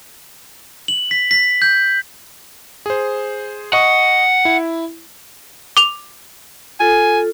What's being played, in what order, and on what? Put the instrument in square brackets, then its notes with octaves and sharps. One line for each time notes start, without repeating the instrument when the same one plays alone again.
[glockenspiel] F#7
B6
B6
G6
[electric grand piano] G#4 C5
[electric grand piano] D#5 C#6 D#6 [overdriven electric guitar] F#5
[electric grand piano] E4
[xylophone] D6 F7
[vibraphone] F4 A4 [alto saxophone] G#5